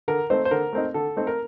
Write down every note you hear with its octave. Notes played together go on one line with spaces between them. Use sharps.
D3 A#4
A3 C4 D#4 C5
C5
D3 A#4
A3 C4 D#4
D3 A4
A3 C4 D#4
A#4